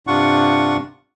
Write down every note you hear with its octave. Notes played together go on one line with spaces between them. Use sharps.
G2 C3 D4 F4 F#5 C#6